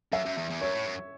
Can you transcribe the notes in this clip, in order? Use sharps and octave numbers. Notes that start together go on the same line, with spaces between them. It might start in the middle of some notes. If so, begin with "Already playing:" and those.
F#2 E5
F#2
E2
E2
F#2 C#5
A2
F#2